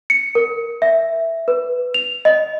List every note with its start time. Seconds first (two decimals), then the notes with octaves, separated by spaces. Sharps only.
0.10 C#7
0.35 A#4
0.82 E5
1.48 B4
1.94 F7
2.25 D#5